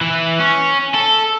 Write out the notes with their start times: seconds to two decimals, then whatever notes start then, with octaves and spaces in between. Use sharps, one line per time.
0.01 E3
0.40 C#4
0.94 A4